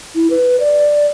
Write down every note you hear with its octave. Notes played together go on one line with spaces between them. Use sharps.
E4
B4
D5